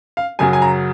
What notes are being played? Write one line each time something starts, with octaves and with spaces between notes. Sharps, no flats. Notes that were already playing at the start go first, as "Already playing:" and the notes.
F5
F#2 C#3 F#3 G#5
G#5
A#5